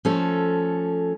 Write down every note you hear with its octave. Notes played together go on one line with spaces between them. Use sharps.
F3 A3 C#4 A4